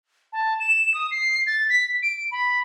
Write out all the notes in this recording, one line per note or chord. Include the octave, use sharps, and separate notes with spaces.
A5
E7
D#6
C7
A6
B6
D7
B5